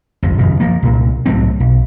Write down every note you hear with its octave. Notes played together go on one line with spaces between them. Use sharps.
G1 F2
D#1 F#2 C#3
F3 A#3
C2 A#2
C2 A2 F#3 C4
B1